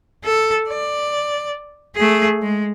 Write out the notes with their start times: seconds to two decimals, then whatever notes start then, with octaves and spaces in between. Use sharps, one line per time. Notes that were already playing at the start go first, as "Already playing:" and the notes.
0.24 A4
0.68 D5
1.95 A3 G#4
2.42 G#3